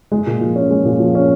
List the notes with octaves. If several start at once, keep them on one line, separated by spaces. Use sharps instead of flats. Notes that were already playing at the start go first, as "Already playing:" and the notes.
G#3
A#2
F3
C#4
G#3
A#2
F3
C#4